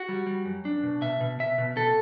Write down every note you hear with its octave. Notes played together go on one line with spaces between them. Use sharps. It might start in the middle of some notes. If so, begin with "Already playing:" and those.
Already playing: F#4
G3
G3
F#2
D4
B2
B2 E5
B2
B2 E5
B2
B2 A4